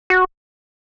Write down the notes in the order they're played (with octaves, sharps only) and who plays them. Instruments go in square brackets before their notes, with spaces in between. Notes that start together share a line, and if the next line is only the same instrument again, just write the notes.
[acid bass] F#4